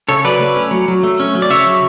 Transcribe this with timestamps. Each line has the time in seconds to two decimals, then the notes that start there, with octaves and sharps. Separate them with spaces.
0.09 C#3 A4 C#5
0.25 F#3 B4 D5
0.40 A3
0.56 C#4
0.71 F#3
0.88 F#3
1.03 A3
1.20 C#4
1.35 F#3
1.42 D5
1.50 C#3 C#5 E5
1.66 F#3